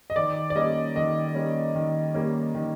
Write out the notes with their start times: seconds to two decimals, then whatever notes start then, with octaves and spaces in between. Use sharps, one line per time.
0.10 D#5
0.16 D#3 D5
0.50 D5
0.56 G3 A#3 C#4 D#5
0.95 D#3 D#5
1.35 G3 A#3 C#4
1.75 D#3
2.14 G3 A#3 C#4
2.55 D#3